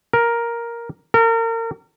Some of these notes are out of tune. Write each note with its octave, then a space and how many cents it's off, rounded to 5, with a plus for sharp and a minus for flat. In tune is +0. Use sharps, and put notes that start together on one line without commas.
A#4 +5
A#4 -35